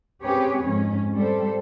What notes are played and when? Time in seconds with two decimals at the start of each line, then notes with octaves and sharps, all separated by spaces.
0.23 C4 C#4 G4 G#4 B4 C#5
0.61 F2 G#2 C#4
1.16 G3 A4 C5